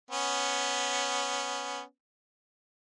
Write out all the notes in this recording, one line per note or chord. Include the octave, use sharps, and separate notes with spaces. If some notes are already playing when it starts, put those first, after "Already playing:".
B3 C#4